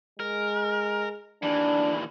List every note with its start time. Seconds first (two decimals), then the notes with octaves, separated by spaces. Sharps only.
0.20 G#3 A#4
1.43 D#2 E3 D4